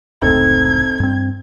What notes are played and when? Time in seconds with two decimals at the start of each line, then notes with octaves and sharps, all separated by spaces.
0.22 F1 C#2 A2 C4 D#4 A4 G#6
1.00 G2 C4